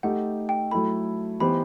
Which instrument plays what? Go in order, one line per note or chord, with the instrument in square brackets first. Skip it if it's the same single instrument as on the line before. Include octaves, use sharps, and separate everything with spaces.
[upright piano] A3 D#4 G4 [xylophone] F#5
[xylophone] G5
[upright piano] F#3 A3 E4 A4 [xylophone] B5
[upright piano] E3 B3 D#4 G4 C5 [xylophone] B5